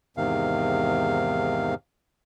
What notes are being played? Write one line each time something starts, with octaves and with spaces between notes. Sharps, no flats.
E2 G#2 C3 D#3 F5